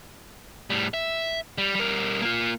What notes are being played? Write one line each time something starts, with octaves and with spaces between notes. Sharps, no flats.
A2 G3
E5
G3
G3 A#4
A#3 F4